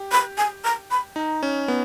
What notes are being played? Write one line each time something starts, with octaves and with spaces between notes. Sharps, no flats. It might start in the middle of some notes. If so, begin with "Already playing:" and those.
Already playing: G4
B5
G#5
A#5
B5
D#4 A#5
C#4
B3